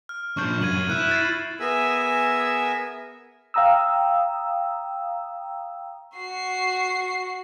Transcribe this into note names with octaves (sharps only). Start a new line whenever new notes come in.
F6
A#2 D4 C#6 G6
F#2 G#6 D#7 F#7
E4 F#6
A6 C7
B3 G#4 A#4 E5 G#5 E6
F5 G5 A#5 D#6 E6
F#4 C7